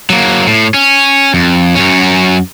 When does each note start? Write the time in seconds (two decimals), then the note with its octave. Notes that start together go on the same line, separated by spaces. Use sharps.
0.10 F#3 A#3
0.47 A2
0.74 C#4
1.34 F2
1.75 F#2 C#4